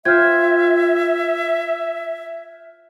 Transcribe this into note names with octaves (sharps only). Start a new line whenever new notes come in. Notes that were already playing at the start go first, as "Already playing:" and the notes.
F4 C5 E5 G5 F6 G6 G#6